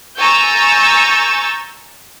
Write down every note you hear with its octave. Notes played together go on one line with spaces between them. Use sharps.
G#5 A#5 C#6 E6 G6 A6